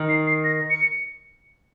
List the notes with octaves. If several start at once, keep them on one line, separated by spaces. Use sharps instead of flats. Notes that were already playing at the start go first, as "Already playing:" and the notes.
Already playing: D#3
C7
C7
A#6
C#7